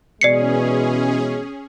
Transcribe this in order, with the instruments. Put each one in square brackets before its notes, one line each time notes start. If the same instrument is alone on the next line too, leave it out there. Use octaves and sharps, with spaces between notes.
[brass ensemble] B2 E3 G#3 [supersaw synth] C#4 G#4 [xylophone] D5 C7 C#7